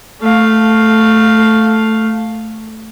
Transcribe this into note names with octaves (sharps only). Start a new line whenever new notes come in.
A3 F5